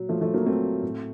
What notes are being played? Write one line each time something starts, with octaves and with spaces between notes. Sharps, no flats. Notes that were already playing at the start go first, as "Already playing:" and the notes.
Already playing: A#2 F#3
F3 A3
F3 A3
F#3 A#3
A3 C4
A2